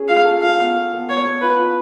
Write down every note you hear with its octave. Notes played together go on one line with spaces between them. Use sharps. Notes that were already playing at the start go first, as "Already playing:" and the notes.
Already playing: C#4 G#4
F4 F5
A4
F4 F5
B3
A4
B3
B3 C#5
B3
F4 B4
F4